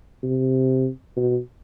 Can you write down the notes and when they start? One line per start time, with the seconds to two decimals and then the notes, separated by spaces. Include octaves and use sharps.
0.23 C3
1.16 B2